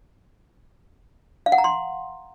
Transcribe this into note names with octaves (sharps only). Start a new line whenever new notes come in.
F5
F#5
A#5
C6